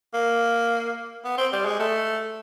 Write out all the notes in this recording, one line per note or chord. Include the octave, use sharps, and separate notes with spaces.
A#3
B3
C4
G3
G#3
A3